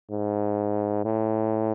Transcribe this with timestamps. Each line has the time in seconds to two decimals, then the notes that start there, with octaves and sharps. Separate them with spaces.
0.11 G#2
1.05 A2